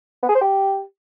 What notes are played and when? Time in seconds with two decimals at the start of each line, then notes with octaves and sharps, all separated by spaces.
0.23 B3
0.29 G#4
0.35 C5
0.41 G4